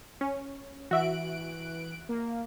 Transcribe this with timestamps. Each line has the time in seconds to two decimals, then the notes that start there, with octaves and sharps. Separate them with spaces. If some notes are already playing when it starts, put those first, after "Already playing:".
0.21 C#4
0.91 E3 F#4 E5 F#6 D7
2.09 A#3